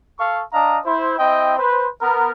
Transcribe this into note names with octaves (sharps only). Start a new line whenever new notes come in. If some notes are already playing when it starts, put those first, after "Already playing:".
A4 F5 C#6
D4 D#5 F5 A#5
E4 C5
C4 E4 D#5 G5
B4 C5
B3 A#4